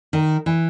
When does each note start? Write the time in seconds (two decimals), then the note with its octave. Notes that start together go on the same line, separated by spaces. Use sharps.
0.13 D#3
0.46 E3